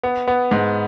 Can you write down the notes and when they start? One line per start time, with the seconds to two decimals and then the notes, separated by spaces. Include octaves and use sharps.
0.03 B3
0.28 B3
0.51 G#2